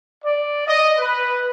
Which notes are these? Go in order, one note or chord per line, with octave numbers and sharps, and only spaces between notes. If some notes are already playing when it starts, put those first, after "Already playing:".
D5
D#5
B4